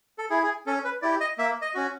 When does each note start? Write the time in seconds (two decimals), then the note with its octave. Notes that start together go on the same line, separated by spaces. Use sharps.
0.18 A4
0.30 E4 G#4
0.43 G#4
0.66 C#4 A4
0.84 B4
1.02 E4 G4 D5
1.20 D#5
1.38 A#3 E5
1.62 D#5
1.74 C#4 F#4